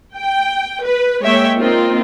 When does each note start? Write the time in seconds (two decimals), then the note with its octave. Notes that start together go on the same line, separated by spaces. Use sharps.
0.17 G5
0.84 B4
1.22 G#3 A#3 C#5 E5 G5
1.59 A#3 C4 D#4 F4